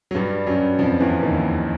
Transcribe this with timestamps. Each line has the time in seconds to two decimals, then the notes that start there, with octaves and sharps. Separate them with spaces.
0.11 F#3
0.15 G2 G3
0.47 F#2 F#3
0.79 F2 F3
1.00 E2 E3
1.23 D#2 D#3